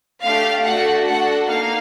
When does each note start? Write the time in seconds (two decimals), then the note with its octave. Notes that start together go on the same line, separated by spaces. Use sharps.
0.23 A3 D4 G4 F5
0.64 A3 D4 F#4 F#5
1.06 D4 F#4 A4 F#5
1.48 A#3 D#4 F5